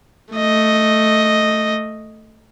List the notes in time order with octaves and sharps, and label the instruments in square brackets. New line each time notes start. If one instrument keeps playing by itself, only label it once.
[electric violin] A3 D#5